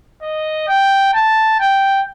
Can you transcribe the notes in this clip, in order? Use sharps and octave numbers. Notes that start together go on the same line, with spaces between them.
D#5
G5
A5
G5